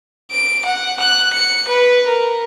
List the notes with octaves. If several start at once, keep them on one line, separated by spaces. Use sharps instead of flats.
D7
F#5
F#6
C#7
B4
A#4